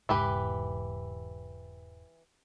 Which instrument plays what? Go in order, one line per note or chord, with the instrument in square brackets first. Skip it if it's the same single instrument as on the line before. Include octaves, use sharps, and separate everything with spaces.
[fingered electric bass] E1 G#2 C#3 [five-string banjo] E3 G4 B4